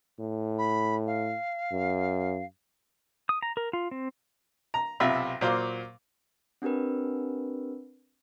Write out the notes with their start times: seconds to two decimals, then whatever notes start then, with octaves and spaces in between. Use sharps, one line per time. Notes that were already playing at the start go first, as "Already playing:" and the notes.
0.20 A2
0.58 B5
1.06 F5
1.72 F#2
3.29 D#6
3.43 A#5
3.57 A#4
3.73 F4
3.91 C4
4.74 A#5
5.00 B1 C3 F4 E5 B5
5.41 A#2 F#3 C5 F5 C6 D6
6.62 C4 D4 G4 A#4 B4